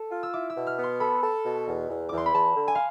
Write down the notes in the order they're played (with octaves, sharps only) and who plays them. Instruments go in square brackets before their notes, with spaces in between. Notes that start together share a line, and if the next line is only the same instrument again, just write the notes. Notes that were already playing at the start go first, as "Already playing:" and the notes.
Already playing: [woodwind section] A4
F4
[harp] E6
[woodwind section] E4 [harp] D6
[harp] E6
[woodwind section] B2
[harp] F6
[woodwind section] B3 [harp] C6
[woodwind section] A4 [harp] B5
[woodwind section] A4
B2
E2
E2
[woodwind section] E2 [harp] D6
[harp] C6
B5
[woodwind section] E2 [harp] A5
[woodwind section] D3
[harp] G#5
F5